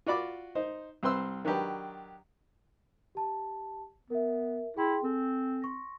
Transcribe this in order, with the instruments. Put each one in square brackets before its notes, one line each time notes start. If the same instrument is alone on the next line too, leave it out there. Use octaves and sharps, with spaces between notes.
[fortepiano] F4 F#4 D5 B5 D6
D#4 C5
C2 C4 B4 C5 C6 E6
D#3 F#3 D4 G4 B4
[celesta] G4 A5
[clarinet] B3 [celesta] A#4 E5
[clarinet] E4 [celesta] G#4 G5 C6
[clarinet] C4 [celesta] A4 G#5
[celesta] C6 C#6 A#6